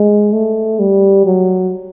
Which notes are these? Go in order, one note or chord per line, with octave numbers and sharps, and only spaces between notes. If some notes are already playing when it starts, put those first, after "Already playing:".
Already playing: G#3
A3
G3
F#3